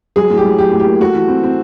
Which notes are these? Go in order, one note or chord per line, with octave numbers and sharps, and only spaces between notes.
F#3 G#4
A2
G4
F#3
F#3 G4
A2
G4
A#3
A3 F#4
E3
C4
C4